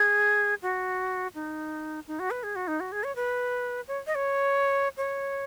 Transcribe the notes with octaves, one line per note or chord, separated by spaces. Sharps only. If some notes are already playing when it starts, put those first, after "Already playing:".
Already playing: G#4
F#4
D#4
D#4
F#4
B4
G#4
F#4
D#4
F#4
G#4
C#5
B4
C#5
D#5
C#5
C#5